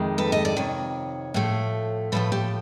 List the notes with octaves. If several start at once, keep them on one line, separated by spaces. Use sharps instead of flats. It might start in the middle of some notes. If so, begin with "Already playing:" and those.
Already playing: F2 C3 D#3 G#3
A4 B4
D#5
D5
F2 C3 D#3 C#5
A2 F3 A3
A2 F3 A3 A4 B4
G4 A4